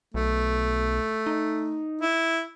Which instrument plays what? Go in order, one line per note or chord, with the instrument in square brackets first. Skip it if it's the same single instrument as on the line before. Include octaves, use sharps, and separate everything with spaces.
[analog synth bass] B1 [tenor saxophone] A3
[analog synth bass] D#4
[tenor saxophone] E4